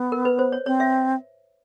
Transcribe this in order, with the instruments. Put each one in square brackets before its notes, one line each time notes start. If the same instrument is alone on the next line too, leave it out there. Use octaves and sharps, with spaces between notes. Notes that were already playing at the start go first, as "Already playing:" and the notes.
Already playing: [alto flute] B3
[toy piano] A#4
B4
C5
C#5
[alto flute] C4 [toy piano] C#5
[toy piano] E5